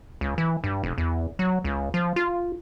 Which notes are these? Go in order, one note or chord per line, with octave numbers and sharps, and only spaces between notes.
C#2
E3
G2
F1
E2
F#3
C#2
F3
F4